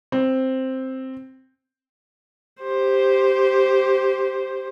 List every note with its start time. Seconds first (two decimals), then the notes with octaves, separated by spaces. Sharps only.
0.12 C4
2.62 G4 C5